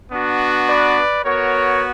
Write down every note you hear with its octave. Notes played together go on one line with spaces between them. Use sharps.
B3 D4 F#4
B4 D5
B3 F#4 A#4 C#5